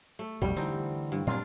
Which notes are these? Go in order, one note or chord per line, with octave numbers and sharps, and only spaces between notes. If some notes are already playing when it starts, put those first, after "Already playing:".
A3
B1 F2 B2 G3
D3 E3 C4 D#4
G2
A#2 F#3 C4 D4 F4